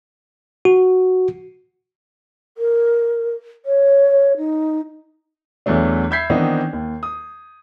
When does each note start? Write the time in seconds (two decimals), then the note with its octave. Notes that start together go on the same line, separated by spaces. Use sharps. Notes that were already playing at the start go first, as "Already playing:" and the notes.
0.65 F#4
2.58 A#4
3.65 C#5
4.37 D#4
5.66 E2 E3 F#3 A3 D4
6.11 E5 B5 G6 G#6 B6 C7
6.30 D#3 E3 B3 C4 D4 D#4
6.73 D#2
7.03 D#6